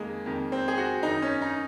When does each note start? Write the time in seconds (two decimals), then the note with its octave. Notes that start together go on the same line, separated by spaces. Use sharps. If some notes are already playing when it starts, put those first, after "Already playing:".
Already playing: F2 D#3 G#3 A#3
0.26 F2 D#3
0.52 C4
0.68 G#4
0.78 F#4
1.03 F#2 D#3 D#4
1.22 C#4
1.42 D#4